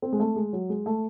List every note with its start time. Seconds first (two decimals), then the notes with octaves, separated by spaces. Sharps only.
0.02 C4
0.12 G#3
0.20 A3
0.36 G#3
0.53 F#3
0.69 G#3
0.86 A3